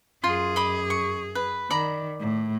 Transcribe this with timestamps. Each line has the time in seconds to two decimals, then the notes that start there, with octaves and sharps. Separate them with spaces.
0.24 F#2 F4 G#4 C6
0.56 D#5 B5 D6
0.90 C#6
1.35 B4
1.71 D#3 D5 A#5 B5
2.20 A2